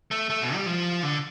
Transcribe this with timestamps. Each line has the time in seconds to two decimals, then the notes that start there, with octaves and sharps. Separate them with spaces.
0.11 A3
0.30 A3
0.42 B2
0.54 G3
0.66 F3
1.03 D3